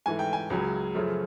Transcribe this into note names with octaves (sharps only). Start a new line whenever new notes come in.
G#2 E3 A3 G#5
G5
G#5
C#2 C#3 F#3
F#2 C#3 F3 A3